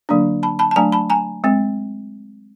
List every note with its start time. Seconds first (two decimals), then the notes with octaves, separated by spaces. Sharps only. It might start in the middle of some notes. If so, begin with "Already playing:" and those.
0.09 D3 F#3 A#3 D4
0.43 A5 B5
0.59 A5 B5
0.71 A5
0.76 F#3 A3 D4 G#5 A#5
0.92 A5 B5
1.10 G#5 A#5
1.44 G#3 C4